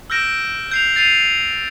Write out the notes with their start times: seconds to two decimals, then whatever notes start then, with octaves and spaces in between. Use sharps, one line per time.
0.10 E6 F6 G6 A#6 D7 E7
0.71 G6 C7 F7
0.96 A6 C7 D#7 F7